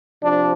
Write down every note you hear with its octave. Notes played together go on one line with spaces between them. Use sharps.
C3 F3 D4